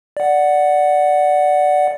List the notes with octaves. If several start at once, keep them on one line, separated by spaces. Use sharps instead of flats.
D5 F#5